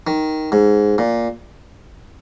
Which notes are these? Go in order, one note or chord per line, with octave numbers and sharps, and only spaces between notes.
D#3
G#2
A#2